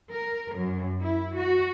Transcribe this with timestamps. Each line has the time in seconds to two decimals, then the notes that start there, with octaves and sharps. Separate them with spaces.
0.13 A#4
0.55 F#2
1.02 E4
1.37 F#4